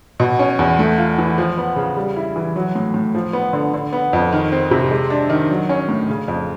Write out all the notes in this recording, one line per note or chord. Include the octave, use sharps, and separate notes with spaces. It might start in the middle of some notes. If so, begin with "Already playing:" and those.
B2
C#4
E2
A3
F4
E3
F3
B3
C#3
G3
E4
E3
F#3
A2
A2
F3
B3
D3
D3
B3
F2
D#3
C4
C3
G#3
D4
D#3
F#3
C#4
A2
C#3
F2